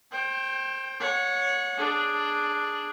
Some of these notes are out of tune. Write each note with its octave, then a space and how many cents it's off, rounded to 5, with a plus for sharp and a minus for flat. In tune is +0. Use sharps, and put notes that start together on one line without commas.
C5 +35 G5 +0
C#5 +0 F#5 -30
D4 +0 G#4 +0